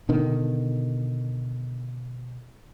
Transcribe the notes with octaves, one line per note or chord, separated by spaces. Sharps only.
B2 D3 D#3